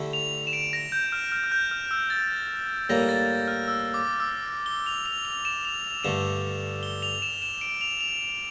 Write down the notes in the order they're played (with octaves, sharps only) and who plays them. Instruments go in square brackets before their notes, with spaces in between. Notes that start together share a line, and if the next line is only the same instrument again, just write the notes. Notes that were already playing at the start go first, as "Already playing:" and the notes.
Already playing: [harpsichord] D3 A3 E4 G4
[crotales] F7
E7
D7
A#6
G6
F6
F6
F6
G6
F6
E6
A6
[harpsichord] A2 G3 A#3 [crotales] A#6
[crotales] A6
F6
E6
D6
E6
G7
F7
F7
F7
E7
F7
F7
[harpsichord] G2 D3 A3 [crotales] E7
[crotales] G7
F7
E7
E7
D7
F7
F7